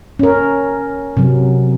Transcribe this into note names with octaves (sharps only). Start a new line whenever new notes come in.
C#4 A#4
C3 F#3